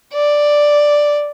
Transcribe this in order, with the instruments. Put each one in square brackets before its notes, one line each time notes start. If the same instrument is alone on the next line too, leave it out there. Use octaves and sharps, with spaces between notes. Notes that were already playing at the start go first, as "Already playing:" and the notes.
[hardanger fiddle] D5